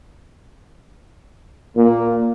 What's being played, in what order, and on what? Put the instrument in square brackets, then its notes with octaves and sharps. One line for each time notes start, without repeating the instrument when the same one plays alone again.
[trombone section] A#2 A#3